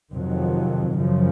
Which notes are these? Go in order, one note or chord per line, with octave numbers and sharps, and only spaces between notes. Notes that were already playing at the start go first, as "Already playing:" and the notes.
F2 C3 D#3 F#3
F#2 C#3 F3